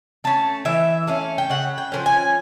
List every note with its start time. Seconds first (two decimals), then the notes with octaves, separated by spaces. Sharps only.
0.24 A3 C#4 A5
0.65 E3 E5
1.07 A3 C#4 F5
1.38 G5
1.50 C#3 F#5
1.78 G5
1.92 F3 A#3 C#4
2.06 G#5